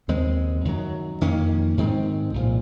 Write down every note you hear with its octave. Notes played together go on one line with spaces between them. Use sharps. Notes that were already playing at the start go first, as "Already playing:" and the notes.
D#2 C#3 G#3 C4
F#2 D#3 F#3
F2 D#3 A#3 C#4
G#2 D#3 G#3 C4
C2 A#2 F3